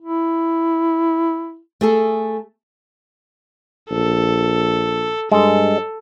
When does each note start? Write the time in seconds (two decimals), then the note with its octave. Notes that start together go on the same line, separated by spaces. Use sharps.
0.02 E4
1.81 A3 G#4 A4
3.91 A#1 A4
5.32 G2 G#3 A4